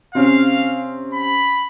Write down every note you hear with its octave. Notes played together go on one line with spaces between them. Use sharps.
C3 C4 C#4 F5
B5